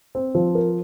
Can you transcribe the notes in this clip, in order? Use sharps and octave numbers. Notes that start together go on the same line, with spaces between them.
C4
F3
A#4